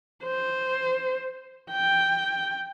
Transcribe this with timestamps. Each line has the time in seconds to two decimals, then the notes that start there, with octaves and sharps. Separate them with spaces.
0.24 C5
1.72 G5